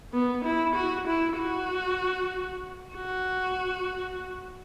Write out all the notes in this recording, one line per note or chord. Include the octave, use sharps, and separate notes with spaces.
B3
E4
F#4
E4
F#4
F#4